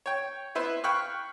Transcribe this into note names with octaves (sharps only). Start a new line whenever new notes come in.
C#5 G5
B3 E4 B4 C5
F5 G5 B5 C#6 F6 F#6